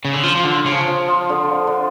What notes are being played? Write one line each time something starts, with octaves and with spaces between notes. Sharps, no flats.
C#3
D3
F3 F4
F3
D3 F4
C#3
F3
F3
F3
D3
D3
D3